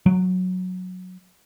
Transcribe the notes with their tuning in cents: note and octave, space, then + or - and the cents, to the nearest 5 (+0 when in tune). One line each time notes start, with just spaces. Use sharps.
F#3 -10